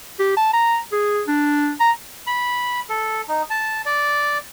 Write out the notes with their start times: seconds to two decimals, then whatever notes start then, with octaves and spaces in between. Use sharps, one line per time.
0.19 G4
0.37 A5
0.53 A#5
0.93 G#4
1.28 D4
1.80 A#5
2.27 B5
2.89 A4
3.28 D#4
3.50 A5
3.86 D5